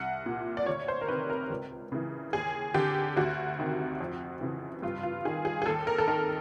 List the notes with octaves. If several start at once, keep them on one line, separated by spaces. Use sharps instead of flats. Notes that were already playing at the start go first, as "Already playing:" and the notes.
Already playing: C2 F#5
A#2
D5
D2 C#5
C5
A#4
C3 D#3 B4
A#4
C#2
C#3 E3
D#2 G#4
D3 G4
D2 F#4
C3 D#3
F2
C#3 E3
G2 F4
F4
D#3 G#4
G#4
G#4
D#2 A4
A#4
A4
D#3 A#4